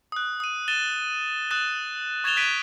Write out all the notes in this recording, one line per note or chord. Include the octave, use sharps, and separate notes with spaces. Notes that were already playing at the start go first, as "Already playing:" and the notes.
D#6 F#6
D#6 D#7
A6 D#7 E7 G7
D#6 F#6 A6 E7
C#6 G#6 A6 E7 F7 G7
F#6 G#6 B6 D7 D#7